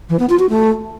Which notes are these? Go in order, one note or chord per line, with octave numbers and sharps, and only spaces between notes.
E3
B3
F4
F#4
A3